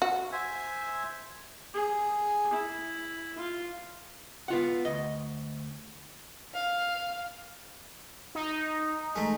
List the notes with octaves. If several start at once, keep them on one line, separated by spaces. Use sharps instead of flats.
F#4
C5 E5 G#5
G#4
E4
F4
B3 F4 F#5
D2 D#5
F5
D#4
G#3 A3